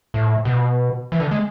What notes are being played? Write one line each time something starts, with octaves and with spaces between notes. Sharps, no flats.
A2
B2
E3
D3
G#3